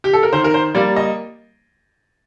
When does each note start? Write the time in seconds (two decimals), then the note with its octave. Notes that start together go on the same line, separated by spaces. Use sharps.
0.04 G4
0.13 A4
0.23 A#4
0.33 D#3 C5
0.44 A#4
0.54 C5
0.75 G3 A#3 D5
0.96 D#5